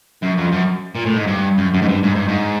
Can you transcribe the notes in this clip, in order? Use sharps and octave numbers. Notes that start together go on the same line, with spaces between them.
F#2
F2
F#2
A#2
A2
G#2
G2
F#2
F#2
G#2
G2
G#2
G2
G#2